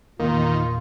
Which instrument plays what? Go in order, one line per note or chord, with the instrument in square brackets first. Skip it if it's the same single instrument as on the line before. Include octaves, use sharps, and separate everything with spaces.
[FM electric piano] E2 A#2 [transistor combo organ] D#3 [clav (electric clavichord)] A#3 [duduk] F4